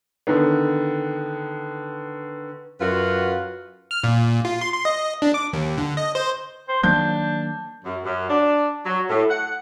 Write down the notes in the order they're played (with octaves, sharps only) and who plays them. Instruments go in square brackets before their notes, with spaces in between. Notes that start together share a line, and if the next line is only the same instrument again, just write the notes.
[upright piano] D3 D#3 B3
[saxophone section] F#2 F4 F#4 B4
[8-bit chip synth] F6
A#2
F4
C6
C6
D#5
D4
D6
D#2
D3
D#5
C5
[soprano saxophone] C5
[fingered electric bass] D#3 F#3 A#3 [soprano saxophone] D4 [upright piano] G6
[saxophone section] F#2
F#2
D4
F#3
A2
F#5